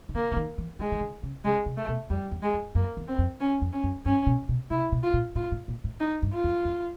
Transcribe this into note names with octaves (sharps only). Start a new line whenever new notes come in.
D#3
D3 A#3
D3
D#3
E3
D#3 G#3
D#3
D3
C#3
C#3 G#3
C3
A3
B2
F2 G3
E2
G#3
F2
F#2 A#3
E2
C4
F2
C#4
F2
C#4
F#2
G2 C#4
B2
B2
C3 E4
B2
F4
A#2
A2 F4
A2
A#2
A2
D#4
G2
F4
F2
F2